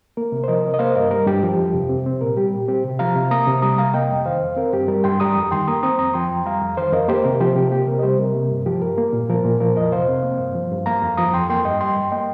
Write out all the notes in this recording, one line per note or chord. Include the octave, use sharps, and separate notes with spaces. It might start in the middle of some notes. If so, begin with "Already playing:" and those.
A#3 A#4
C3
C5
F3 A#4 D#5
C3
D#5
A#3 C5 F5
G2 A#4 D#5
G3 A#4
G2 G4
F3
F2
C3
C4
C4
A#2 A#4
G3 G4
A#2
C4 G4
C3
F3 F5 A#5
C3
A#3 A#5 D#6
C3
G3 A#5 D#6
C3 F5 A#5
A#3 D#5 G5
F2
D#3 C5 F5
F2
C4 A#4
G2 G4
G3 A#4
G2 G5 C6
G3 A#5 D#6
F2
D#3 G5 C6
A#3 A#5 D#6
C4 A#5 D#6
F2 A#5 D#6
F3 G5 C6
F2
G3 F5 A#5
F2
D#3 C5 F5
F2 A#4 D#5
A#3 G4 C5
C3 A#4
F3 G4 C5
C3 G4
A#3 G4
C3 A#4
D#5
G3 G4 C5
C3 A#4
A#3
G2
F3 G4
G2 A#4
A#3
A#2
F3 A#4
A#2
F3 A#4
F2 A#4 D#5
C3 C5 F5
C4
A#3
G2
F3
G2
A#3 F5 A#5
F2
F3 A#5 D#6
F2 G5 C6
A#3 G5 C6
G2 D#5 G5
G3 G5 C6
G2
A#3 D#5 G5